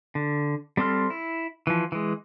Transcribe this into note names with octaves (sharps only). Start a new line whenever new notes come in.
D3
G3 C4 A4 C6 F6
E4
E3 F3
E3 G#3